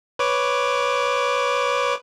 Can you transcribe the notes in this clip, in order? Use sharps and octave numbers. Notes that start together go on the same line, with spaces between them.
B4 C#5 D6